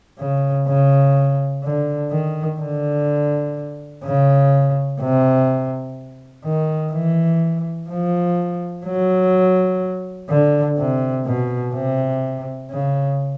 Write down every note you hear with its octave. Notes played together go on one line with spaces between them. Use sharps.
C#3
C#3
D3
D#3
D3
C#3
C3
D#3
E3
F3
F#3
D3
C3
B2
C3
C#3